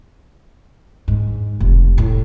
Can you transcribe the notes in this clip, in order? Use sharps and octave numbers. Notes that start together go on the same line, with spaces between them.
G#2
F1
A2